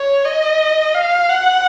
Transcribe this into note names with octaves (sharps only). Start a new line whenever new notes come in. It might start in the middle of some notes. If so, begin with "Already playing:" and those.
Already playing: C#5
D#5
F5
F#5